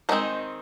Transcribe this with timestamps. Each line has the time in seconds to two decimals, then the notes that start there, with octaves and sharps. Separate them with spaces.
0.09 D#3 G#3 C4 D#4 A#4